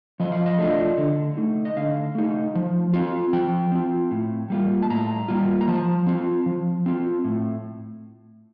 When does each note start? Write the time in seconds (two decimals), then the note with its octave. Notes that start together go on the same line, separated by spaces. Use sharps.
0.20 F3 D#5
0.32 F5
0.46 D#5
0.58 A3 D4 F4
0.97 D3
1.37 A3 D#4
1.65 D#5
1.77 D3 F5
2.15 A3 D#4
2.55 F3
2.93 C4 F4
3.33 F3 G5
3.72 C4 F4
4.11 A2
4.50 G3 A#3 F4
4.83 A5
4.90 A2 A#5
5.28 G3 A#3 F4
5.61 A#5
5.68 F3 A5
6.07 C4 F4
6.46 F3
6.86 C4 F4
7.24 A2